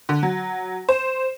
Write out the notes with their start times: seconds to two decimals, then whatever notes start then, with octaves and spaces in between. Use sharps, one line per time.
0.09 D3
0.23 F#3
0.89 C5